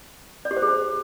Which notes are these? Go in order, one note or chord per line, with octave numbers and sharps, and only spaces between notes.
D5
G4
C5
G#4
C5